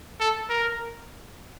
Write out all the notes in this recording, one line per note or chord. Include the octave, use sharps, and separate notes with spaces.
A4
A#4